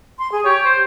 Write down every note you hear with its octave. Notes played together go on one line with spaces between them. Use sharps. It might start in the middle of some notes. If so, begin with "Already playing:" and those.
C6
G#4
G4 C#5
C5